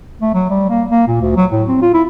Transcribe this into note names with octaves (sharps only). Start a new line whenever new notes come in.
A3
F#3
G3
A#3
A#3
A#2
D2
F#3
A2
C4
F4
E4